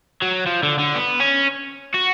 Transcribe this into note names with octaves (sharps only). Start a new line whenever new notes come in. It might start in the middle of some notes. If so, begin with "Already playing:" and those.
F#3
F3
D3
D3
B3
C#4
F#4